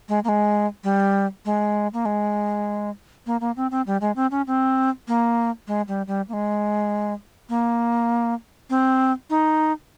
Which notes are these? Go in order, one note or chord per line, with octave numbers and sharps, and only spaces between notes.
G#3
A#3
G#3
G3
G#3
A#3
G#3
A#3
A#3
C4
C4
G3
G#3
C4
C#4
C4
A#3
G#3
G3
G3
A#3
G#3
A#3
C4
D#4